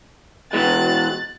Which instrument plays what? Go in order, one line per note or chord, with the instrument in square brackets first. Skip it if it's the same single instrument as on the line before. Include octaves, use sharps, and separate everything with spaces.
[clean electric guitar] B2 E3 G#3 [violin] F#6 A6